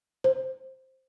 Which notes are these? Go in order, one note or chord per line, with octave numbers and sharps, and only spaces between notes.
C5